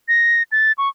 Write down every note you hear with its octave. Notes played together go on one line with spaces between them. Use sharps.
A#6
A6
C#6